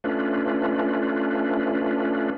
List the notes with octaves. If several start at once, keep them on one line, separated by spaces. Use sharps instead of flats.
A3 C#4 D4 F4 B4